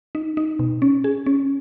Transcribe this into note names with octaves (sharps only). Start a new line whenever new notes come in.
D#4
D#4
B2
C#4
G#4
C#4